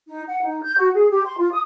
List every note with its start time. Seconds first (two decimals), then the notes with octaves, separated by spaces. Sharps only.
0.08 D#4
0.28 F#5
0.44 D#4
0.64 G6
0.78 F#4
0.95 G#4
1.10 G4
1.25 C6
1.38 F4
1.52 D#6